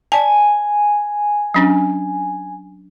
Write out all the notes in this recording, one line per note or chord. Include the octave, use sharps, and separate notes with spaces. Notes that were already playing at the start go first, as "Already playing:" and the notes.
D5 G#5 A5
F#3 C#4 D4